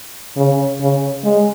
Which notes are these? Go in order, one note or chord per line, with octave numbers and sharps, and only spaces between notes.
C#3
C#3
G#3